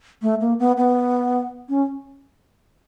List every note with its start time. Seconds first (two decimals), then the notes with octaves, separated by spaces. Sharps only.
0.22 A3
0.41 A#3
0.59 B3
0.77 B3
1.69 C#4